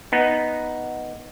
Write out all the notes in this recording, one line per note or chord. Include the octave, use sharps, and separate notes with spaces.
B3 D#4